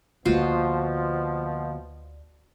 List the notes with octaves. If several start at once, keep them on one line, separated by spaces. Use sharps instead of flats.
D2 B2 D3 F3 A#3 F4 F#4 C5